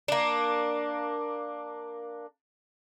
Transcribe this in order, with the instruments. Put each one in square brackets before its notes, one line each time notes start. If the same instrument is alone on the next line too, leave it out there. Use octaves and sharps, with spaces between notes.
[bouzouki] A#3 D4